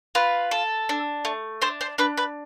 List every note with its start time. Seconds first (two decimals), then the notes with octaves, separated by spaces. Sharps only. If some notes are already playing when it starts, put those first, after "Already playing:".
0.15 F4 B4
0.51 A4
0.89 D4
1.25 A3
1.61 D4 C5
1.81 C5
1.98 D4 B4
2.17 B4